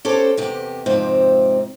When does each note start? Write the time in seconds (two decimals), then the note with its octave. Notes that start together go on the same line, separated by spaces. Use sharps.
0.05 C#4 G4 A4 C5
0.37 E2 C3 G4
0.86 F2 G#2 C3 F3 C4